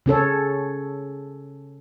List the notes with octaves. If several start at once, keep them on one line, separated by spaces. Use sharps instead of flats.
C#3 C#4 A4 C#5